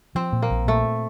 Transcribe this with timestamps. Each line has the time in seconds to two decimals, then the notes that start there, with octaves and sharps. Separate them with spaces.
0.15 F3 C4
0.33 A#2
0.42 A#3
0.50 A#1
0.67 A#2 A3